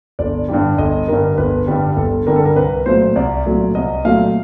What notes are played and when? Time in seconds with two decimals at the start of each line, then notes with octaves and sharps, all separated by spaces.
0.19 G1 D5
0.49 G2 D3 G3
0.78 G1 D#5
1.08 G2 D3 G3 A#4
1.38 G1 B4
1.67 G2 D3 G3
1.97 G1 A4
2.27 G2 D3 G3 A#4
2.36 A4
2.45 A#4
2.56 C2 B4
2.86 A#2 F#3 A3 C5
3.16 C2 D5
3.46 A#2 F#3 A3
3.75 C2 D#5
4.05 A#2 F#3 A3 F5